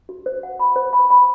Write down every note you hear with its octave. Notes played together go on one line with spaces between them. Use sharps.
F#4
C5
F#5
B5
C5
B5
B5